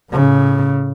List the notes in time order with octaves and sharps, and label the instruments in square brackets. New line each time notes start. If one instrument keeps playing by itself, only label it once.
[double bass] A2 C#3